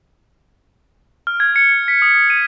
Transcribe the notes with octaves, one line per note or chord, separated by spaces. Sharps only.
F6
G#6
C#7
B6
D#6
D#7